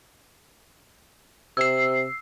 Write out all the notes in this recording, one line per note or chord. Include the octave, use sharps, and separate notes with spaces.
C3 E6 C7